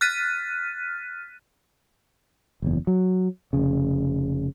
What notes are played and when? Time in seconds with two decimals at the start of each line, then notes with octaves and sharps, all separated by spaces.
0.01 F6 F#6 A6 B6 D#7
2.62 F#1 E2
2.87 F#3
3.53 F1 C#3